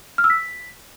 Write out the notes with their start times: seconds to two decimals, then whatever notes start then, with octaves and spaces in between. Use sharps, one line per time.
0.18 F6
0.24 E6
0.30 B6